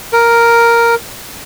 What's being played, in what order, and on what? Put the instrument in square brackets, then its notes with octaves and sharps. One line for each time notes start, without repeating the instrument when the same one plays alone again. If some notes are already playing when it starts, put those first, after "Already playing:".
[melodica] A#4